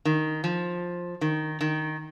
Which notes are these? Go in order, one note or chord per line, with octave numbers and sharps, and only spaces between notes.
D#3
F3
D#3
D#3